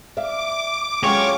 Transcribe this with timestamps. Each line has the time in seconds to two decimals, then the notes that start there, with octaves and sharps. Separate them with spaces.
0.17 D5 E5 F5 D6
1.04 F#3 G#3 C#4 F4 C#5 G5